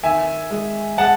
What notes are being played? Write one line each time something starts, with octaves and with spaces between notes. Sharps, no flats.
D#3 E5 G#5
G#3
G#3 F#5 A5